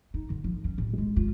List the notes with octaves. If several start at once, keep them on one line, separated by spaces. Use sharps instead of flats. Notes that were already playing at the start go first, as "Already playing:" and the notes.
D#4
D3
F3
C#4
A1
G#3
F4